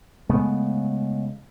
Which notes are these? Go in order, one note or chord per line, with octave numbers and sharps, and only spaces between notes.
C#3 G#3 A3 B3